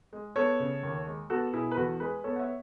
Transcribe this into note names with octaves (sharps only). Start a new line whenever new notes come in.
G#3
B3 A4 C#5
C#3
D#2
G#3
B3 F#4 A4
B2 E4 G#4
B4
E2 F#4 A4
G#3 G#4 B4
B3 A4 C#5
F#5
C#5 E5